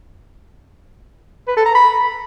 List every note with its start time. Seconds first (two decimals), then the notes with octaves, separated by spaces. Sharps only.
1.47 B4
1.56 A4
1.66 A#5
1.75 B5